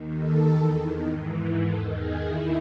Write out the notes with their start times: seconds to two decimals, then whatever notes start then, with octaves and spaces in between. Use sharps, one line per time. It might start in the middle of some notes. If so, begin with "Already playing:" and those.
Already playing: D#2 D#3
0.19 A4
0.48 E2 D#3 A4
1.07 G#2 E3
1.67 E2 D#3 A4
1.97 G#4
2.26 D#2 D#3 E4